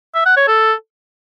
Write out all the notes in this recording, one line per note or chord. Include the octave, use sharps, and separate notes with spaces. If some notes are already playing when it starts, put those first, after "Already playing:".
E5
F#5
C#5
A4